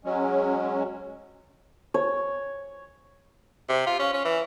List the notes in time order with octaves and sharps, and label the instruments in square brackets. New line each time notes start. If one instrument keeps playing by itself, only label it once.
[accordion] F#3 G#3 C#4
[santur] C#5
[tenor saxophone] C3
F4
C#4
C#4
E3